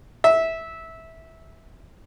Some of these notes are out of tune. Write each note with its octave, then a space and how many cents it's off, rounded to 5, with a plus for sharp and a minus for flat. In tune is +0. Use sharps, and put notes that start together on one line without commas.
E5 -15